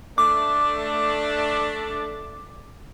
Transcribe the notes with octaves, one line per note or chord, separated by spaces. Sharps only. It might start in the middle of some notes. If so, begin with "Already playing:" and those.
A3 D4 D6